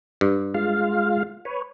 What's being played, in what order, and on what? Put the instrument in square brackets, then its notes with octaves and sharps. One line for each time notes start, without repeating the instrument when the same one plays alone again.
[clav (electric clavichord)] G2
[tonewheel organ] G#3 F4 F5
B4 C#5